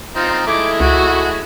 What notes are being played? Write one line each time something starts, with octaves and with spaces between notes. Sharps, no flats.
C4 D#4 F4
G#3 A3 E4 D6
C#2 F#4